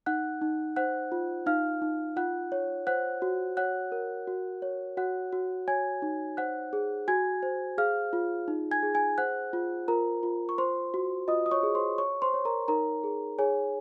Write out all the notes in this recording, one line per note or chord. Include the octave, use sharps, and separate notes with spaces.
D#4 F#5 F#6
D#4
C5 F#5 F#6
F4
D#4 F5 F6
D#4
F4 F#5 F#6
C#5
C5 F#5 F#6
F#4
C#5 F#5 F#6
A#4
F#4
C#5
F#4 F#5 F#6
F#4
C#5 G#5 G#6
D#4
C5 F#5 F#6
G#4
F#4 G#5 G#6
C5
G#4 F5 F6
F4
D#4
G#5 G#6
G#4
G#5 G#6
C5 F#5 F#6
F4
F4 A#4 A#5
F4
C#6
C5 C6
F#4
F4 D#5 D#6
D#6
C#5 C#6
G#4
C5 C6
C#5 C#6
C5 C6
C#5
A#4 A#5
D#4 A#4 A#5
G#4
G#4 C#5 G#5